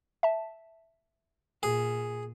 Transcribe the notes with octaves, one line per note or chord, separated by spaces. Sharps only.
E5 A5
A#2 G#4